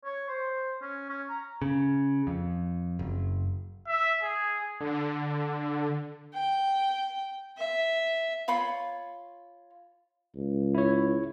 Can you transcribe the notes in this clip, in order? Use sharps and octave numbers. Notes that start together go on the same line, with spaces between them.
C#5
C5
C#4
C#4
A#5
C#3
F2
F#1
E5
G#4
D3
G5
E5
F4 C#5 B5 C6
C#2
E4 C#5